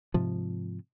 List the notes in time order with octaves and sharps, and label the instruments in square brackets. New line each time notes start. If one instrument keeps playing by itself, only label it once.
[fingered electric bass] G#2 C3 F3